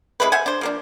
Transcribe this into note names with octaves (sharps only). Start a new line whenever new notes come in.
C3 G#3 E4 B4
C5 E5 F#5 G#5
D4 C5
F3 A#3 D4